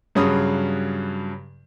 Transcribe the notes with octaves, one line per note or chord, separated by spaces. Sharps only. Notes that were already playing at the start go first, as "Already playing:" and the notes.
G2 C#3 F#3 C#4 B5 D#6